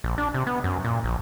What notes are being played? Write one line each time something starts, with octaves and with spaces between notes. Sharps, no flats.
A#1
D4
C3
B3
F#2
A#2
A#1